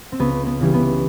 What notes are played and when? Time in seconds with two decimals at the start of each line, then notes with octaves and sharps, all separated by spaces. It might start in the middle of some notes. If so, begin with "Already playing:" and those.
0.12 C4
0.19 C#2 B3
0.47 B3
0.60 C#3 E3 G3
0.74 B3